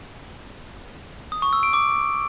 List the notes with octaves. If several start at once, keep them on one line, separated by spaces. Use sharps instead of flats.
D#6
C#6
E6
D7
D6